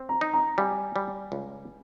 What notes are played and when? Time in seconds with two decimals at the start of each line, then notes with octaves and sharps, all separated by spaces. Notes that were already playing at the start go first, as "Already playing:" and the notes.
Already playing: C4
0.09 A#5
0.21 D#4
0.34 A#5
0.58 G3 G#5
0.96 G3
1.32 C#2